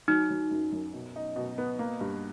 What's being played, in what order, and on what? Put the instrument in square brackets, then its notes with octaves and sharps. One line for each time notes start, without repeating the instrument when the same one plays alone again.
[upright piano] F#3 [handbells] D#4
[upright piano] F#3
F#2
F#2
B2
D#4
B2
B3
A#3
G2